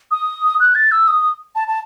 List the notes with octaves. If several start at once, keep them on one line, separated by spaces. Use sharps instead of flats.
D#6
F#6
A6
E6
D#6
A5
A5